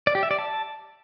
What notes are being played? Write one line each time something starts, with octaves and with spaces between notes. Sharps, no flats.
D5
G4
E5
D5
A5